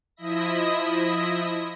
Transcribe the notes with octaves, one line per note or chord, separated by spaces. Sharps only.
F3 E4 D#5 E5 B5 A#6